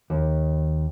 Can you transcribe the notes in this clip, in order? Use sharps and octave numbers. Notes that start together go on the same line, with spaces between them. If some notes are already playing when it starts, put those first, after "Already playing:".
D#2